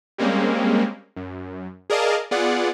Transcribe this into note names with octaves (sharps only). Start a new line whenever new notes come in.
G3 G#3 A#3 C4 C#4
F#2
G#4 A#4 D5 D#5 F5 A5
B3 F4 G#4 D5 F#5